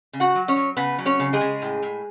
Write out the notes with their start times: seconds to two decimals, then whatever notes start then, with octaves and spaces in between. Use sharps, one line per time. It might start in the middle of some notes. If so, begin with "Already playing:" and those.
0.13 C#3
0.20 F#4 F#5
0.35 F#3
0.48 C#4 C#5
0.56 F#3
0.77 C#3 B3 B4
0.98 F#3
1.06 C#4 C#5
1.20 C#3
1.33 G#3 G#4
1.41 C#3
1.62 A2
1.82 A2